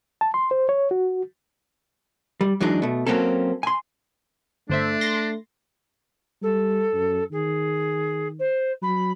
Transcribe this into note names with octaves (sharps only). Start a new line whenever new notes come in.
A5
C6
C5
C#5
F#4
G3
F#2 E3 F#3 G#3 D4 D#4
B2 A3
F#3 A#3 C4 C#4 A4
G#5 C6
G1 A3 D4 C5 E5
C6 A6 A#6
G3 A4
F#2
D#3 G#4
C5
F#3 B5